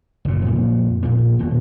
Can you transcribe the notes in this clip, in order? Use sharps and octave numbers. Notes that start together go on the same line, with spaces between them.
F#1 A#2
F2 A#2 A#3
A#1 A#2 A#3
D#1 B2